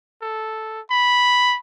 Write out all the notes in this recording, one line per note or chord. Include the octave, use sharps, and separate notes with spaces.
A4
B5